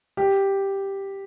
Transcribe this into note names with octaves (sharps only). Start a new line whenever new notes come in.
G4